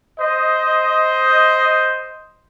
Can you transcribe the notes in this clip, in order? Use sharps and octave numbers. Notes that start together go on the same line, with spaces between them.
C5 D#5